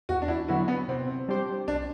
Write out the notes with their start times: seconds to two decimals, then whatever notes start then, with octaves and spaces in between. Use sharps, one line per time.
0.09 E2 F#4
0.22 D4
0.28 E4
0.48 D3 F#3 B3 E4 F#4
0.68 B3
0.88 C3 C4
1.28 G3 D4 G4 C5
1.68 B1 D4